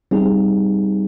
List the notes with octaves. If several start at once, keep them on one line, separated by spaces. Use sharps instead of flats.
G3 C4 D#4 G#4